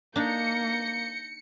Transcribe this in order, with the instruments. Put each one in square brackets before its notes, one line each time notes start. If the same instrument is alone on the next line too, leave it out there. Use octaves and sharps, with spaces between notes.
[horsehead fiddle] A#3 [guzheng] D4 D#4 A#5 [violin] G6 A#6 [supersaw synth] C#7